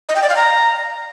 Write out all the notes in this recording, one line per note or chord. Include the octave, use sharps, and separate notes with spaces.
D#5
G5
D5
F5
A#5